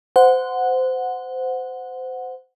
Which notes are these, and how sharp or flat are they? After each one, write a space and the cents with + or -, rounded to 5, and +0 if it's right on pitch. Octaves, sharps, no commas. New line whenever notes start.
C5 -20 F#5 -10